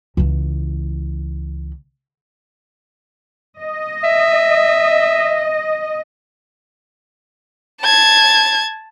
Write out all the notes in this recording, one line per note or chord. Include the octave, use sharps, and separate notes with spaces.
C#2 E3
D#5
E5
A5 G#6